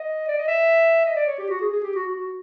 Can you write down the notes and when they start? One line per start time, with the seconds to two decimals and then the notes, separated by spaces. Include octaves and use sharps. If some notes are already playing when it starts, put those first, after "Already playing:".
Already playing: D#5
0.28 D5
0.38 D#5
0.48 E5
1.06 D#5
1.16 D5
1.27 C#5
1.38 G4
1.50 F#4
1.61 G#4
1.72 G#4
1.83 G4
1.95 F#4
2.07 F#4
2.17 F#4